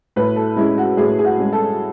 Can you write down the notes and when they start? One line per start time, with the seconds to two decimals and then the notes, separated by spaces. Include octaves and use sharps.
0.16 A2 B4
0.36 A4
0.57 G#3 C#4 E4
0.78 F#4
0.97 A2 G#4
1.19 G#4
1.25 F#4
1.38 G#3 C#4
1.53 A4